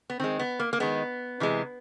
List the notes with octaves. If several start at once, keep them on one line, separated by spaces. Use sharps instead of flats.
B3
D#3 G#3 C4
B3
A#3
A#3
D#3 G#3 B3
C3 E3 G#3